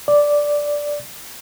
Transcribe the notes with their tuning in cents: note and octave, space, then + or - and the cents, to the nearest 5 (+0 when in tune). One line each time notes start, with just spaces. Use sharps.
D5 -5